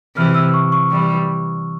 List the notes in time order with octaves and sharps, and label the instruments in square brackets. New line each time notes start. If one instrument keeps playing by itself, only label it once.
[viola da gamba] C3 E3 [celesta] F6
[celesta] E6
E6
C#6
C#6
[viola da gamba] E3 G3